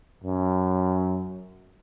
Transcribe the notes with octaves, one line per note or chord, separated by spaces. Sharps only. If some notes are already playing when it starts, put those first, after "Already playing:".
F#2